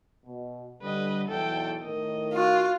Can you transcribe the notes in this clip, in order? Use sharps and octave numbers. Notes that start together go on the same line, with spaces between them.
B2
D3 G3 B4 D#5
B1 E2 A4 G5
A2 D#3 A#4 D#5
F4 F#4